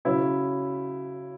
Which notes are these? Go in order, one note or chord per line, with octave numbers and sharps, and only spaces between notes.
C#3 F#3 C#4 E4